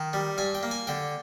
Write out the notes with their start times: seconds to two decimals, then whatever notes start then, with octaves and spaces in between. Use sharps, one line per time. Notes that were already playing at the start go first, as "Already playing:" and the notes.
Already playing: D#3
0.13 G3
0.38 G2 G#5
0.55 G5
0.63 A#3
0.71 G#5
0.87 D3 G5